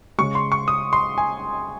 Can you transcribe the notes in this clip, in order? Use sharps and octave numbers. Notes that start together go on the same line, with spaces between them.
C#3 G#3 C#6
C6
C#6
D#6
C6
G#5